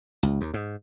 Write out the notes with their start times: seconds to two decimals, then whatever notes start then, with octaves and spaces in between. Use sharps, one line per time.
0.23 C#2
0.41 D#2
0.54 G#2